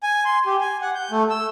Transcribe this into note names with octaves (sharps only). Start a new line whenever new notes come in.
G#5
C6
G4
G#5
F#5
G6
A3
E6